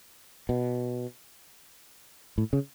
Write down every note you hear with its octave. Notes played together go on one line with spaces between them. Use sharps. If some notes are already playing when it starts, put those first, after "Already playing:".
B2
A2
C#3